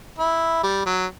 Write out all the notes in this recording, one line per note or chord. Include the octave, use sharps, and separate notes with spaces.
E4
G3
F#3